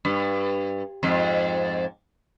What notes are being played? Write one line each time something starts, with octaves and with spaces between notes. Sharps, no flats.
G2
F2 G#2